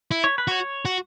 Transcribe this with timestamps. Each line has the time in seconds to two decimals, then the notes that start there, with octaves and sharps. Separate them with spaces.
0.11 E4
0.24 C#5
0.38 B4
0.48 F#4 C#5
0.85 F#4